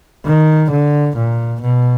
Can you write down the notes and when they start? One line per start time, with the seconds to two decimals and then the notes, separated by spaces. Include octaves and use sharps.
0.26 D#3
0.70 D3
1.17 A#2
1.61 B2